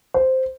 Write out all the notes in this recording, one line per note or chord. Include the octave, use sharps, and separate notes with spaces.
C5